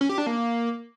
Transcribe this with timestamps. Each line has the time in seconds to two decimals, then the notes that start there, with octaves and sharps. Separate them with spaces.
0.01 C#4
0.09 G4
0.18 D4
0.27 A#3